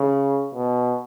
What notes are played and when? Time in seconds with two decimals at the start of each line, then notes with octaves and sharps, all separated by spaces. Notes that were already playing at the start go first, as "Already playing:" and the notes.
Already playing: C#3
0.54 B2